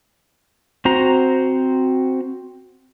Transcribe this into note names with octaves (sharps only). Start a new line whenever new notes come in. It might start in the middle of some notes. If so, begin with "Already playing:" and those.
C4 F#4 C5 A#5